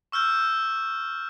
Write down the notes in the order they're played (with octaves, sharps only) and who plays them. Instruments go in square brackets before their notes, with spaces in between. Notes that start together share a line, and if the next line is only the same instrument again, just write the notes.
[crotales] C#6 E6 F6 G6